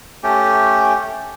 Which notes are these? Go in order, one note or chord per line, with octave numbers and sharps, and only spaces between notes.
A3 C#4 G4